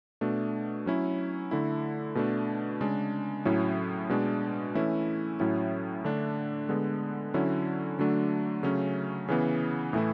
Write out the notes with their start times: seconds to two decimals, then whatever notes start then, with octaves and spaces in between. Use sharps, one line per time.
0.21 B2 A3 D4
0.86 F#3 C#4 E4
1.51 D3 A3 E4
2.15 B2 A3 D4
2.81 C#3 G#3 D4
3.45 A2 F#3 C#4 E4
4.09 B2 G#3 D4
4.75 E3 A3 C#4 E4
5.40 A2 F#3 C#4 E4
6.04 D3 A3 D4
6.69 D3 G#3 B3
7.34 D3 F#3 C#4 E4
7.99 D3 F#3 A3 D4
8.63 C#3 F#3 A3 C#4
9.28 C#3 E3 B3
9.93 A2 E3 A3 E4